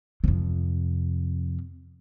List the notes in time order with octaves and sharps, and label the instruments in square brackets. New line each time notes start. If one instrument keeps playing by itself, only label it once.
[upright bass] F2 C3